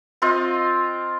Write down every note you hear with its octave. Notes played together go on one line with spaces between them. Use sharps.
C4 F4 D#5